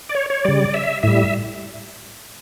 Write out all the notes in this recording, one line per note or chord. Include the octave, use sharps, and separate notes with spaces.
D5
C#5
C#5
C#3 G3 D5
E5
A2 G3 E5